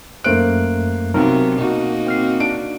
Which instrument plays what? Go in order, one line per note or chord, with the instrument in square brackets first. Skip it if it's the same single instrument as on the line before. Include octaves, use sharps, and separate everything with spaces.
[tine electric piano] F#2 A3 F#6 [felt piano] A#3 C5 D7
[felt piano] B1 C4 [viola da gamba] C3 F#3 B3 [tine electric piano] A#4
[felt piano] B2 [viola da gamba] A#3 D#4 F#4
[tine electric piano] C4 F6 C7
[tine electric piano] D4 [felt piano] D7